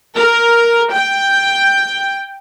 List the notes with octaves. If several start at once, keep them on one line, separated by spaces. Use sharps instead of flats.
A#4
G5